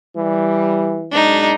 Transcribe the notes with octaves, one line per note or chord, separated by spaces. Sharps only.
E3 G3
F#2 B2 G#3 D4 D#4